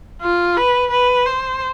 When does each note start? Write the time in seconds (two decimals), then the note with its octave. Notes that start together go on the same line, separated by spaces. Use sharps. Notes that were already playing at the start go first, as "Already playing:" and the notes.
0.22 F4
0.57 B4
0.91 B4
1.26 C5